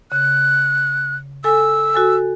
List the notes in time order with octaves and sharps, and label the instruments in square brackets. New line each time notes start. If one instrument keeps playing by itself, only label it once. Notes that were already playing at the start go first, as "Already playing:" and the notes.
[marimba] C#3 [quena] F#6
[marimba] A4 G#5 [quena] E6
[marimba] F#4 A4 G#5